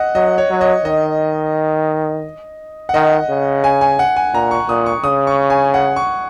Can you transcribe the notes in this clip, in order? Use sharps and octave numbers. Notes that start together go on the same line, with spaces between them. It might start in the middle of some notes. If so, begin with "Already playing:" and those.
Already playing: D#5 F#5
F#3 D#5
C#5
F#3
D#5
D#3 D#5
F#5
D#3 D#5
C#3
G#5
G#5
F#5
G#5
A#2 A#5
C#6
A#2 D#6
C#6
C#3 D#6
C#6
G#5
F#5
C#6